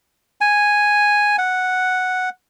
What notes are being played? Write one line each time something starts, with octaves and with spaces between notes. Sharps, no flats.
G#5
F#5